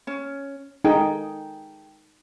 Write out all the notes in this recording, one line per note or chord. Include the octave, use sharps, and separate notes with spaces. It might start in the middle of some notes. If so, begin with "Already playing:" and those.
C#4
D#4 G#4 A4 G5